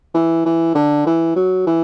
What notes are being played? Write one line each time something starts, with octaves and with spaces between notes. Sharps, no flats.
E3
E3
D3
E3
F#3
E3